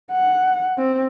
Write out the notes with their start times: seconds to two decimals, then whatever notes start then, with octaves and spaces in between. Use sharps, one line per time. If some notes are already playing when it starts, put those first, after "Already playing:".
0.12 F#5
0.78 C4